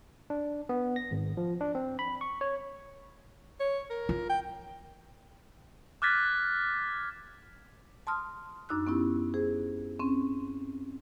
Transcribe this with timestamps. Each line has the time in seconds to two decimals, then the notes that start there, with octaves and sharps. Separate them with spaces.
0.30 D4
0.69 B3
0.96 A#6
1.11 G#1
1.37 F3
1.61 D4
1.75 C4
1.99 B5
2.21 C#6
2.41 C#5
3.60 C#5
3.90 A#4
4.09 F4
4.29 G5
6.02 D6 F6 F#6 G#6 A6 B6
8.07 A5 C6 D#6 F6
8.69 F#2 D4 D#4 D6 E6 F#6
8.87 B3 C#4 E4 G4
9.34 G#4 C5
9.99 C4 C#4